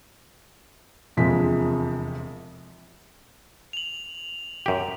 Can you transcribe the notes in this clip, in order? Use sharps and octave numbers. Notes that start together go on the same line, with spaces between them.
E1 F2 C3 F3 G#3 B6
F7 F#7
F#2 G4